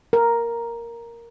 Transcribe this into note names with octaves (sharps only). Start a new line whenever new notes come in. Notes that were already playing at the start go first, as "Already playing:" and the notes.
A#4